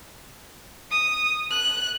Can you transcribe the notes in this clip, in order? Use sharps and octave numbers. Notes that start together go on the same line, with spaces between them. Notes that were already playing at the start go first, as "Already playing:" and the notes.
D#6
F#6